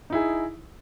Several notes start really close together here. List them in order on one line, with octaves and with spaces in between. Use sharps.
D#4 E4 G#4